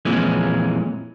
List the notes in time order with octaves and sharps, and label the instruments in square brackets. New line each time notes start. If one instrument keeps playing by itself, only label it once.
[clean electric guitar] F2 A#2 E3 G#3 C#4